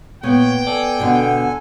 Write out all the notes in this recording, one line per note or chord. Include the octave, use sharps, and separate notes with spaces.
A#2 B3 C#5 G5
A4 D5 G#5
B2 D3